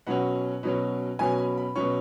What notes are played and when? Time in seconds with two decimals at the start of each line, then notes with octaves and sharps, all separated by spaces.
0.07 B2 F#3 C#4 F#5
0.63 B2 F#3 C#4
1.19 B2 F#3 C#4 G#5
1.38 B5
1.57 B5
1.76 B2 F#3 C#4 C#6